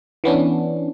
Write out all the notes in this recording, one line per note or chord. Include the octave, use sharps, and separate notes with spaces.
E3 B3 C#4 D4